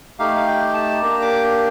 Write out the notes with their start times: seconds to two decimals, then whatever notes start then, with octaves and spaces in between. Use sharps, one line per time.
0.19 A3 D#4 G4 F5
0.36 F5
0.47 G5
0.74 A5
1.02 A#3 D4 G4 A#5
1.22 D6